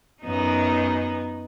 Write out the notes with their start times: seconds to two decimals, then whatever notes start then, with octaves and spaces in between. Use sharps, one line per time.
0.23 F#2 B3 D#4